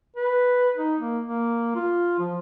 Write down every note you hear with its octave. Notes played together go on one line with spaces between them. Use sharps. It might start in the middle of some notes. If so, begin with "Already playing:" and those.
B4
D#4
A#3
A#3
F4
F3